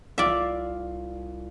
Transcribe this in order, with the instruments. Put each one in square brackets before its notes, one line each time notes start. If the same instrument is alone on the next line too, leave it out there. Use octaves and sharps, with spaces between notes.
[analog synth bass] C2 [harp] F4 F5 [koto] D5 E5